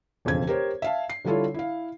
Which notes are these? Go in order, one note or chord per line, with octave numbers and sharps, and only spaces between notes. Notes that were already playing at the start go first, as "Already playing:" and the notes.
E1 F2 C#3 G#6
G4 A#4 C5 C#5
E5 F5 A5
C7
D3 G3 E4 F4 A4 C#5
E4 F5